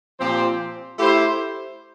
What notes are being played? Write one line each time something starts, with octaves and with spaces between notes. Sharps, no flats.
A#2 F3 C4 G4 C5
A3 E4 G4 C5